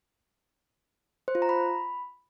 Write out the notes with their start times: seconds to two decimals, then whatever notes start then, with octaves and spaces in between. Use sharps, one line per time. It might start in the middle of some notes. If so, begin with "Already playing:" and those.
1.28 C5
1.35 F4
1.42 A#5
1.49 B5